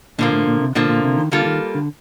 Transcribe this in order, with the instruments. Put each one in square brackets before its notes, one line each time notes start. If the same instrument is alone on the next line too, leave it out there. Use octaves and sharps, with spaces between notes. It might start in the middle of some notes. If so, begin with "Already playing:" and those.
[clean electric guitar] A#2 [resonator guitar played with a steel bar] D3 F3 A#3
[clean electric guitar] A2
A#2
C3
[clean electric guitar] A#2 [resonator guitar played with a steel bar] D3 F3 A#3
[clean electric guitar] A#2
C3
D#3
[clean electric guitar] D3 [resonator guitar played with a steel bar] G3 A#3 F4 A4
[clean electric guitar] D#3
D3